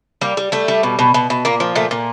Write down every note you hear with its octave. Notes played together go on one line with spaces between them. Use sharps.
G3 A#3
G3
G3 A3
G3
B2
B2
B2
B2
A#2 A#3
F3
A#2 A3
A#2